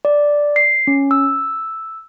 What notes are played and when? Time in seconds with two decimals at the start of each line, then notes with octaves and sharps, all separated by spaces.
0.05 D5
0.56 C7
0.87 C#4
1.11 E6